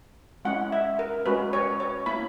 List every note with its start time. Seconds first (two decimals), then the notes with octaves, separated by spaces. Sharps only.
0.45 G#3 C#4 E4 F#5
0.72 E5
0.99 A#4
1.26 G#3 C#4 F#4 B4
1.53 C#5
1.80 C#5
2.06 A#3 E4 B5